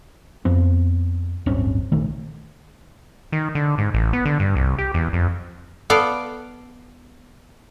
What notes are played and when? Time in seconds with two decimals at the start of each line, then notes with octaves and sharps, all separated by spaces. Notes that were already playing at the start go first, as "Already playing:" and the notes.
0.45 F2 B3 C4
1.46 D1 G1 C4 C#4
1.92 A#1 D#3 A3
3.32 D#3
3.55 D3
3.78 G#2
3.94 A1
4.13 B3
4.25 D3
4.40 G2
4.56 C2
4.78 G4
4.94 E2
5.13 F2
5.90 B3 A4 D5 F5